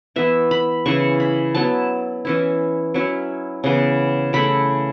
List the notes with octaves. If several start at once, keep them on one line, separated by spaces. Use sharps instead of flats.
E3 B3 E4 E5
B5
C#3 E3 C#4 E4 C#6
B5
F#3 B3 E4 A5
E3 C#4 E4
F#3 C#4 E4
C#3 E3 B3
C#3 A3 E4 B5